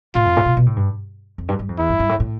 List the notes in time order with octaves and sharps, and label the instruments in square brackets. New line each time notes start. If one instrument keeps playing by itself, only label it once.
[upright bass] A2 [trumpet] F4
[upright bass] F2
A2
B2
B2
A2
G2
F2
G2
G2
F2
[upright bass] E2 [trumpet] E4
[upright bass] G2
G2
A2
A2